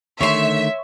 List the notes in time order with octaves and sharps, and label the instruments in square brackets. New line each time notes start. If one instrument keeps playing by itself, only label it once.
[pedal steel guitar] D3 D#3 A3 [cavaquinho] C#5 C6 [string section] E5